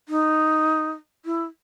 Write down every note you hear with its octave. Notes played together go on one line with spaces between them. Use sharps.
D#4
E4